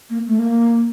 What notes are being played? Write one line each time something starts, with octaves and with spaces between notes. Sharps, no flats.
A#3
A3
A#3